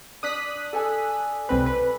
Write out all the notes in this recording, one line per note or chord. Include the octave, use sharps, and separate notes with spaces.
D4 D#6 F#6 B6
A4 G#5
C2 C4 B4
B4